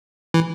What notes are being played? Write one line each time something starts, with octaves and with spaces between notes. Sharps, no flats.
E3